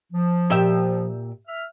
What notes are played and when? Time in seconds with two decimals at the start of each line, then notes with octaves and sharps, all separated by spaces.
0.12 F3
0.50 A#2 G4 E5
1.48 E5 F6